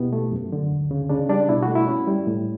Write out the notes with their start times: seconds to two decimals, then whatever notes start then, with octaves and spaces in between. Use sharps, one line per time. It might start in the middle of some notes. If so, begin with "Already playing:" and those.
Already playing: B2 B3 E4 G4
0.13 A3
0.32 F#2
0.52 D3
0.71 D2
0.91 C#3
1.09 C#3 D4
1.29 G3 D4
1.49 B2 E4
1.63 F#4
1.68 A3
1.75 E4
1.88 C#4
2.07 G3
2.27 A2